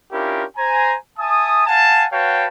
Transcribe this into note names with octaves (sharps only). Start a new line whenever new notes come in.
C#4 D4 E4 F4 G4 A#4
C5 G#5 A#5
E5 G#5 A5 D#6
F5 F#5 G#5 A5
F#4 B4 C#5 F5 G5 A5